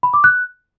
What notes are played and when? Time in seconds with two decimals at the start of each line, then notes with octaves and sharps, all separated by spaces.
0.03 B5
0.14 D6
0.24 F#6